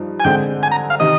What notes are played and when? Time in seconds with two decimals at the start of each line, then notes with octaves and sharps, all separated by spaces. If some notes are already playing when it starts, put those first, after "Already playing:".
Already playing: G2 F3 D#4
0.20 G#5
0.24 D3 G#3 C4 G5
0.63 G#5
0.71 A#5
0.90 F5
1.00 C3 D#3 D#5